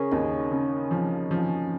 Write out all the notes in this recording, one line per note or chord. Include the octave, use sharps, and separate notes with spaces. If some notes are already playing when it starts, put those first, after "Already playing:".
Already playing: C#3 C#4 G#4 A#4
D#2 D#4
C#3
F3
F3